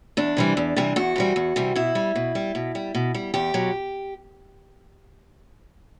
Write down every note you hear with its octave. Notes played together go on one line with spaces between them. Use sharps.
E2 D4
C3 E3 G3
E2
C3 E3 G3
E2 F#4
C3 E3 G3
E2
C3 E3 G3
B2 E4
G3
B2
G3
B2
G3
B2
G3
E2 G4
B2 F#3